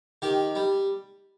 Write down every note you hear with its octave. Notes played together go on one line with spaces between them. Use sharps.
D#3 G4
G3